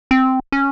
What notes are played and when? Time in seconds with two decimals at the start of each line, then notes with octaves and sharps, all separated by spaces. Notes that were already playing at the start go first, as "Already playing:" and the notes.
0.11 C4
0.52 C#4